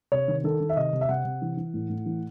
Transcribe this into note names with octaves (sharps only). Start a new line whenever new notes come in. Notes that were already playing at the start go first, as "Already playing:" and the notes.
C3 C#5
D#3
D#3 A4
D#3
E5
C3 D#5
C3
E5
C3 F#5
C3
E3
E3
A2
A2
E3